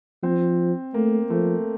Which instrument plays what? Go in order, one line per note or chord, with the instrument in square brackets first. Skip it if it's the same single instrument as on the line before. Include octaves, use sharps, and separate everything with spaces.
[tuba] F3 [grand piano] C4
[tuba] A3 [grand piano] A#3
[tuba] F3 [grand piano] A3